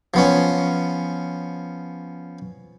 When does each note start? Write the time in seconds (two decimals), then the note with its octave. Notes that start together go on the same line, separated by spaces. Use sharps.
0.14 F3 B3 C#4